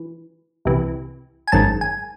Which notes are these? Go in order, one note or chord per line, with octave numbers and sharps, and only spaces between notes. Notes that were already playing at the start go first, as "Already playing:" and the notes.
Already playing: E3
C2 C3 E3
G#5
G#1 F#2 D#3 G#3 A5
G#5